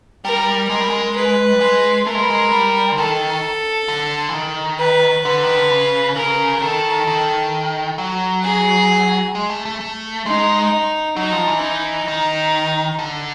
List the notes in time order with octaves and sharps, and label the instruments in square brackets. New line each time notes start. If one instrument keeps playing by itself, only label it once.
[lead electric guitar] G3 [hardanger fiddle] A#4
[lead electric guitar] G#3 [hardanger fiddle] A#4
[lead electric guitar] G3
G#3
[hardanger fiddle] B4
[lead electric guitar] G3
G#3
[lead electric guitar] A3 [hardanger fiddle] A#4
[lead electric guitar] G#3
G3
G#3
G3
D3
[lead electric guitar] D#3 [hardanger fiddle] A4
[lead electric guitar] D3
E3
D#3
[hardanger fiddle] B4
[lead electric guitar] D3 [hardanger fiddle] B4
[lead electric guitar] D#3
D3
C#3
[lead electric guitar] C#3 [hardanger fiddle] A#4
[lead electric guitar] D#3 [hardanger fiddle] A4
[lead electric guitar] D#3
F#3
[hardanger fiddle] G#4
[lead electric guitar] G#3
A3
A3
A3
[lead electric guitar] G#3 [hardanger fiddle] D#4
[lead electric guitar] F#3 [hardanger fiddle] D#4
[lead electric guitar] F3
E3
[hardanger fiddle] D#4
[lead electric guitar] D#3
D3